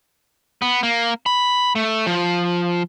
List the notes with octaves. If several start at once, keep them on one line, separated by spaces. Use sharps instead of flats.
B3
A#3
B5
A3
F3